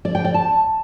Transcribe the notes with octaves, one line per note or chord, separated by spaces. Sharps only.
D5
G5
D5
A5